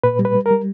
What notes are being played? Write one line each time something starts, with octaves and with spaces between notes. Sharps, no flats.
A#2 B4
G3
B4
G3
A#4
G3